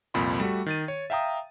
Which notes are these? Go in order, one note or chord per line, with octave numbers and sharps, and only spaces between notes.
C2 F2 A#2 B5 C6
G3 A3 F#4
D#3 A6 D#7
C#5
E5 F5 G5 A#5 D#6